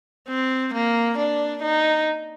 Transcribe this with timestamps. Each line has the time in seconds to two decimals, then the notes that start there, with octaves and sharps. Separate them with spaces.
0.29 C4
0.74 A#3
1.18 D4
1.63 D#4